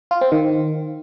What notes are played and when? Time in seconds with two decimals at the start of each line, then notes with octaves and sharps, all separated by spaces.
0.11 F4
0.21 C4
0.32 D#3